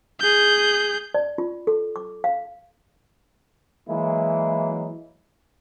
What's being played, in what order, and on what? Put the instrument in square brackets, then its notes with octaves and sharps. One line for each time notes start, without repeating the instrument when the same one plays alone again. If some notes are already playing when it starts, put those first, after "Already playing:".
[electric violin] G#4 G6
[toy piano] D5
F4
A4
D6
F5
[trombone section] E3 F#3 G#3 A#3 E4